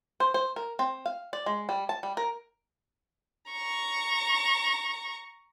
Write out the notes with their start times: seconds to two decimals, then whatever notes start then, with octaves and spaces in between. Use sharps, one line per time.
0.20 C5
0.34 C5
0.56 A#4
0.79 C4
1.06 F5
1.33 D5
1.46 G#3
1.69 G3
1.89 A5
2.03 G3
2.17 A#4
3.52 A#5 C#6